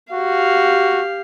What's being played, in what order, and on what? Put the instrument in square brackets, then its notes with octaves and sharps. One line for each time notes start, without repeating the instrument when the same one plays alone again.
[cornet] F#4 [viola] G4 F5